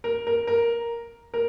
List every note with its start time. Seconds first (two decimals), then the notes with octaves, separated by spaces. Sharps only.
0.04 A#4
0.27 A#4
0.47 A#4
1.34 A#4